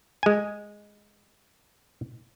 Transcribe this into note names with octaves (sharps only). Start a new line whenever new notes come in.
G#3 G#5